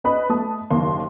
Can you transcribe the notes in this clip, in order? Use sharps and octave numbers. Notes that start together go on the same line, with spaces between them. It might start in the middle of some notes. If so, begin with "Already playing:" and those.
C#4 B4 D#5 B5
A3 A5 D#6
F#1 D#2 A#3 C6